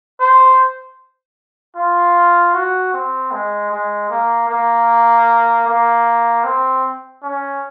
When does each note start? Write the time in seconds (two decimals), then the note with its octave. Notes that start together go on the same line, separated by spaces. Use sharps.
0.20 C5
1.76 F4
2.54 F#4
2.93 C4
3.32 G#3
3.72 G#3
4.10 A#3
4.49 A#3
5.67 A#3
6.44 C4
7.23 C#4